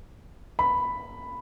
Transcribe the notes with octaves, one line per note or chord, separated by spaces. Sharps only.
B5